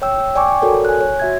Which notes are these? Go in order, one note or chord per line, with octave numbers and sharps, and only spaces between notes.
C#5 G5 E6
D5 G5 G#5 C#6 D6
F#4 A4 A#4 C#5 D5
G#5 F#6
C#5
F#4 E5 G#6